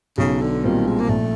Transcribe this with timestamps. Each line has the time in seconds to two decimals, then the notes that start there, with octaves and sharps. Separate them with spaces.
0.18 B1 C#3
0.41 D3
0.64 A#2 D#3 G3 C4 F4
0.87 G#3
0.99 A#3
1.09 A#1 A3